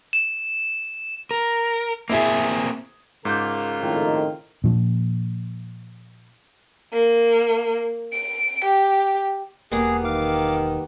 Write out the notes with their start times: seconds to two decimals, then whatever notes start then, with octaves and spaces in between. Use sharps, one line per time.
0.13 E7
1.31 A#4
2.10 A#3 C4 E4 G#4 E5
3.25 G#2 C#3 F4 A#4 D6 G6
3.80 F2 A2 D#3
4.64 A#2 F3
6.93 A#3
8.13 D7
8.64 G4
9.72 E1 G3 A#3 B3 G#4
10.04 D#3 F5 D6